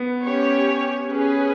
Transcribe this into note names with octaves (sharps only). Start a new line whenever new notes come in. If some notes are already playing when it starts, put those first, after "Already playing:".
Already playing: B3
C#4 G4 C#5
C#4 G#4 B4